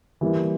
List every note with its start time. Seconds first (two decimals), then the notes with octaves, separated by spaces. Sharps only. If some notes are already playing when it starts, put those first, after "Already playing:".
0.21 E3 G3 A#3 E4